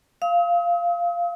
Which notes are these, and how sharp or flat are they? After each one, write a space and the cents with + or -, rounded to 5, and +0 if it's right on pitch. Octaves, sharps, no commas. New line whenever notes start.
F5 -10 D#6 +45